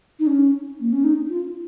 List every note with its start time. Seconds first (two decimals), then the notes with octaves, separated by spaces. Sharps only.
0.19 D#4
0.27 C#4
0.81 A#3
0.92 C#4
1.04 D#4
1.29 F4